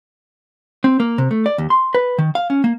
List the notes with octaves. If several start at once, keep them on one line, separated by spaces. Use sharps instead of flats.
C4
A#3
C3
A3
D5
D#2
C6
B4
D#3
F5
C#4
A#3